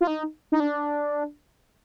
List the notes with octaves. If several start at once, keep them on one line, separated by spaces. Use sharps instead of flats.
F4
D#4
D#4
D4